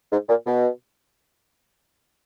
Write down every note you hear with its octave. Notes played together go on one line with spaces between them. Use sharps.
G#2
A#2
B2